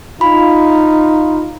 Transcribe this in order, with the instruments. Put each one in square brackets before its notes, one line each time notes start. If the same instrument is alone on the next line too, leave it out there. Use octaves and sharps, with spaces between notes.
[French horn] D#4 [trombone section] F4 [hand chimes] B5